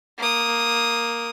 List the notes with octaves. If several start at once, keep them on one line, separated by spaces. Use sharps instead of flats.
A#3 D#6